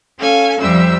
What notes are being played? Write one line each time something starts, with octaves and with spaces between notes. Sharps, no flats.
C#4 A4 F5 G#5
F2 F3 G3 C5 E5 E6